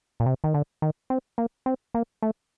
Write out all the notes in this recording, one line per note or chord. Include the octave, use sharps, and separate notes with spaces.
A#2
C3
D#3
D3
D#3
C4
A#3
C4
A#3
A3